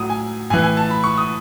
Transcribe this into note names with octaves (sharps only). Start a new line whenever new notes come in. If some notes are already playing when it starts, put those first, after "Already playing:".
Already playing: A2 F#3 D#6
G#5
A2 E3 G#5
G#5
A5
B5
C#6
D#6